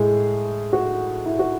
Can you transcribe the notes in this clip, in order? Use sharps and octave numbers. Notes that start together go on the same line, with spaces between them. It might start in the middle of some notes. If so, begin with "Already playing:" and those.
Already playing: A2 G#3 G#4
F#4
E4
F#4